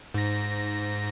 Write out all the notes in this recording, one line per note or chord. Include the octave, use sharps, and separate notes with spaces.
G#2 A#6